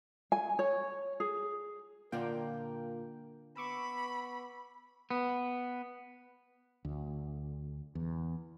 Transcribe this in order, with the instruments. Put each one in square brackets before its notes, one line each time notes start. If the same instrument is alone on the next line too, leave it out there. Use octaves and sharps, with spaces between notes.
[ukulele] G#5
C#5
G#4
[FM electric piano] A#2 F4 G5 [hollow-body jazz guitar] D3 A#3 D5 [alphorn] A#4
[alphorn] B3 [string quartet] B5 [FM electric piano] C#6 D6 E6
[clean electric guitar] B3
[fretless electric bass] D2
E2